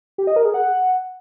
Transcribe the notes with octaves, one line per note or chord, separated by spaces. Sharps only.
G4
D#5
A#4
G#4
F#5